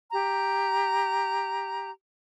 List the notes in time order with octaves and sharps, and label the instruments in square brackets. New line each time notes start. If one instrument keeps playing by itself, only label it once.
[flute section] G4 A#5